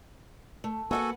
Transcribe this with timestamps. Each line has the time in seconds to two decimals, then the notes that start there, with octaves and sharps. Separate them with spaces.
0.64 A3
0.91 A#3 B3 F#4 A4 E5 F#5 G#5